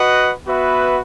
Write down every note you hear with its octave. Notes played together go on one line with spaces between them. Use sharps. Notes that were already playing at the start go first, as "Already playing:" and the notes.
Already playing: F#4 B4 D#5 F#5
B3 F#4 B4 E5